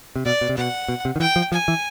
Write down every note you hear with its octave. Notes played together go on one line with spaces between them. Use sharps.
C3
B2 D5
B2
C3
B2 F#5
B2
C3
D#3
E3 G5
F3
F3 G#5
E3